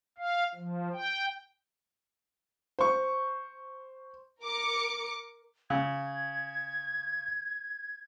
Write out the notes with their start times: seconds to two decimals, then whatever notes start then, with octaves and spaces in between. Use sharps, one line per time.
0.18 F5
0.55 F3
0.93 G5
2.79 C5 C#6
4.43 A#4 D6 C#7
5.70 C#3 G#6